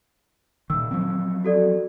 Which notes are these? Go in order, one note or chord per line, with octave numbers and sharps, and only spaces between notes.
A#2 D#3 E6
F3 F#3 C4
F#4 A4 D5